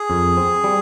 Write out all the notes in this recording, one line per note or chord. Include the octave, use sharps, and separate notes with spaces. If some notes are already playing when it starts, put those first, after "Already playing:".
Already playing: G#4
F2
C4
G3